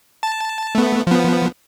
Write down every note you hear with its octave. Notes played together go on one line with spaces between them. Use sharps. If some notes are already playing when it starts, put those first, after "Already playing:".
A5
A3 B3
F3 B3